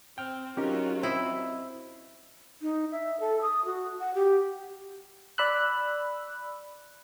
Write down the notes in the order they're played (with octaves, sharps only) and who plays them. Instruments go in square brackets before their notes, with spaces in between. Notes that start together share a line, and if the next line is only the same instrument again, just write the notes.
[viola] C4 [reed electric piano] G5 F6
[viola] F#3 F4 [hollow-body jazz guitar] C#4 D#4 [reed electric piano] G4 A#4
[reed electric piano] C4 C5 D#5 [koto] E4
[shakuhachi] D#4
E5
A4
D#6
F#4
F#5
G4
[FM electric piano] D5 B5 E6 F#6